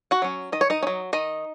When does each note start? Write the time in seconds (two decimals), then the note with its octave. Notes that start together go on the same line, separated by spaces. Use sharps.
0.11 F#4 F#5
0.22 F#3 C#4
0.52 D#3 D#5
0.61 C#5
0.70 D#4 D#5
0.83 C#4
0.87 F#3
1.13 D#3 D#4 D#5